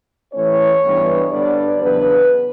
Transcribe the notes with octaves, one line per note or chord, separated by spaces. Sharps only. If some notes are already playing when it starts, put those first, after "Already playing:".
A2 E3 A3 C#4 C#5
G2 E3 G3 B3 D4
G2 D3 G3 B3 D4 D5
E2 C#3 F#3 B3 D4 B4